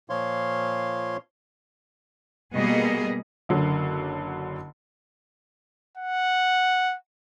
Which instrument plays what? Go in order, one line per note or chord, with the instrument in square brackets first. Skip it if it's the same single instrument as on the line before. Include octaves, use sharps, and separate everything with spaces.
[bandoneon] A#2 F3 C#5 F5 C6
[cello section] B2 G3 A#3 B3 G#4 D#5
[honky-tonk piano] F#1 D3 F#3
[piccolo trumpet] F#5